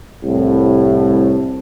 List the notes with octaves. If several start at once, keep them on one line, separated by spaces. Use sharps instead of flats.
C2 A2